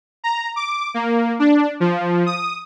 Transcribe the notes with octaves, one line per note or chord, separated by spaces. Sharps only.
A#5
D6
A#3
D4
F3
D#6